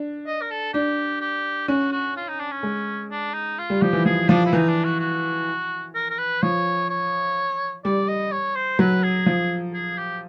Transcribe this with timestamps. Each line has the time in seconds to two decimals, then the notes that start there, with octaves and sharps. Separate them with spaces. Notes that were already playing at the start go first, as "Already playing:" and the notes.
Already playing: D4
0.26 D#5
0.41 A#4
0.51 A4
0.74 D4 G4
1.21 G4
1.68 C#4 F#4
1.92 F#4
2.16 F4
2.28 D#4
2.40 D4
2.52 C#4
2.63 G#3
3.11 D4
3.34 D#4
3.58 F4
3.70 G3
3.82 F3 G4
3.93 E3
4.05 F3 G#4
4.29 F3 D4
4.46 E4
4.53 E3 D#4
4.68 D4
4.85 F#4
5.00 F#4
5.95 A#4
6.10 A#4
6.18 B4
6.42 F3 C#5
6.90 C#5
7.85 G3 D5
8.08 D#5
8.32 C#5
8.55 C5
8.79 F#3 B4
9.03 G#4
9.26 F3
9.74 G#4
9.98 G4